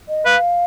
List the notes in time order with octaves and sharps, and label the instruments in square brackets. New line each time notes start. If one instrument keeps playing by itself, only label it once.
[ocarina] D#5
[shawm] B4 [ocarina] F5